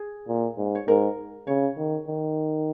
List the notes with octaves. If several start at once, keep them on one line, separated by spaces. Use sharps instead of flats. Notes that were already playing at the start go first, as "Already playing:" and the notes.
Already playing: G#4
A#2
G#2
C#5
G#2 A#4
C#3 C#5
D#3
D#3